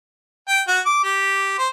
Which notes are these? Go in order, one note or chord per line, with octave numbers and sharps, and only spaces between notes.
G5
F#4
D6
G4
C5